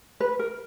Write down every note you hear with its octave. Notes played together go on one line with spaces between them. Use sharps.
B4
A#4